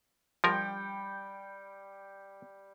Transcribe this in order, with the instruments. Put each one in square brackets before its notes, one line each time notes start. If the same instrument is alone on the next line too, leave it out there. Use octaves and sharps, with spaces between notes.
[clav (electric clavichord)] F3 A#4 [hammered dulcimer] G3 G5